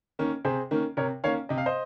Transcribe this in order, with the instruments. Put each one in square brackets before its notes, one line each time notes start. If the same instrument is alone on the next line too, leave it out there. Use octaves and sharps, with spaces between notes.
[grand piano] D#3 A#3 C#4
[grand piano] C3 [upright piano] G#4 C5
[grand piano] D#3 A#3 C#4
[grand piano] C3 [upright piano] A#4 C#5
[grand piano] D#3 A#3 C#4 [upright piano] C#5 F5
[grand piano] C3 [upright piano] D#5
[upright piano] F5
C5 D#5